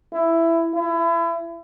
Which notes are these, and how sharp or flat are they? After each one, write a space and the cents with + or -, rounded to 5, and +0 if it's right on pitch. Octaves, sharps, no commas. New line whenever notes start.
E4 +10
E4 +30